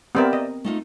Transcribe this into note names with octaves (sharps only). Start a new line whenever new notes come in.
B3 C4 G4 A#4 D5 E5
D#5
A3 D#4 F4